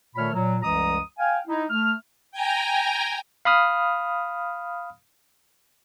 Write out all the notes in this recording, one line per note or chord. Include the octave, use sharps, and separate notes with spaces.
A#2 D#3 A3 C#5 B5 F6
A#2 F#3
C2 F#2 E3 G#3 A#5 D#6
F5 G5 G#5
D#4 E4
A3 F6
G5 G#5 A#5
F5 B5 D#6 F6